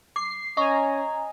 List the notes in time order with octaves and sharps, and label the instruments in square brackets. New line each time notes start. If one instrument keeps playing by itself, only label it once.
[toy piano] D6 [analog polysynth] C7
[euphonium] C#4 [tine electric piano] D#5 [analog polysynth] G#5 A#5 [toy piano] C#6